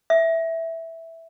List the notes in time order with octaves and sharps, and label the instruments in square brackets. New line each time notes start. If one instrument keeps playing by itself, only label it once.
[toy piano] E5